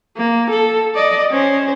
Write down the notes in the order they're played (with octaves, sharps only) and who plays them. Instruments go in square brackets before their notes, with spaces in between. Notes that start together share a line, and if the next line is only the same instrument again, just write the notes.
[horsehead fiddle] A#3
A4
D5 D#5
C#4 C5